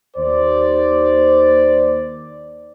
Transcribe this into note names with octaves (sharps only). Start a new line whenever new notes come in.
D#2 C5 D5